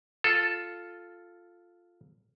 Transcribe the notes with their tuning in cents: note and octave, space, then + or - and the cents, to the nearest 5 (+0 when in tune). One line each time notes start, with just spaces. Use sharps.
F4 +0 A4 +0